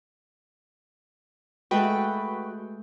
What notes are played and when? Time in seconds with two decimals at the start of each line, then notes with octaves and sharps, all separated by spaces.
1.71 G#3 A3 F#4 A4 B4 G5